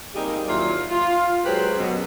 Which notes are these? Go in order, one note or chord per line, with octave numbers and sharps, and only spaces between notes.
G3 A#3 C4 D#4 G4 G#4
D#2 F#3 E4 F4 D5
F4
F#3 G#3 G4 B4 C5
F#2 B2 F#3